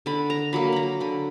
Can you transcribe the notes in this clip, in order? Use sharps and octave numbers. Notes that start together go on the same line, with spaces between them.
D3 B5
A#5
F#3 A#3 B5
A#5 B5
D3 B5